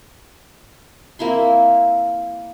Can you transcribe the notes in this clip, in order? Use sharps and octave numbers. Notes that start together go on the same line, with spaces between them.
A#3 C4 E4 C6